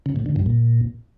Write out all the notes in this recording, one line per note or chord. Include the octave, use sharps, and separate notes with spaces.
C#3
A2
D3
G2
A#2